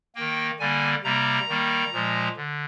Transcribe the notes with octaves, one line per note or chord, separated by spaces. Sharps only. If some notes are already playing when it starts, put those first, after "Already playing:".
D#3 A#3 G5
D3 G3 A#3 G#5
C3 G3 A#3 A#5
D#3 G3 A#3
A#2 F3 G#3
D3